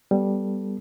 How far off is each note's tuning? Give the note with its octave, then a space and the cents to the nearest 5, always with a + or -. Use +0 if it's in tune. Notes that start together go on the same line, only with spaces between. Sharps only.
G3 +0 B3 +0 A4 +0